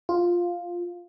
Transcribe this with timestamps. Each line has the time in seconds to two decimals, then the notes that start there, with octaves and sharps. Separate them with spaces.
0.09 F4